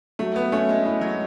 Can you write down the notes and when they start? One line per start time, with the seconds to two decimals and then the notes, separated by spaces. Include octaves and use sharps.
0.19 F#3 A3
0.36 B3
0.52 A3 C#4
0.69 G#3
0.85 G#3 E4
1.01 F#3